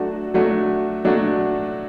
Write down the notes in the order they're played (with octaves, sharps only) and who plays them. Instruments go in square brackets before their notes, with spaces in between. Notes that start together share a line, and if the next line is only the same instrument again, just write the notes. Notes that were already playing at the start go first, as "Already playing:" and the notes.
Already playing: [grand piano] F#3 A3 D4 F#4
F#3 A3 D4 F#4
F#3 A3 D4 F#4